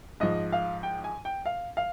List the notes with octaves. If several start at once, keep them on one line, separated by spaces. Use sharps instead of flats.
G#2 F3 D#5
F5
G5
G#5
G5
F5
F5